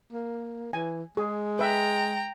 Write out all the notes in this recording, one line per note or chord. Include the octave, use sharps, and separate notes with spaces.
A#3
E3 G#5
G#3 G#4
B4 E5 G5 A#5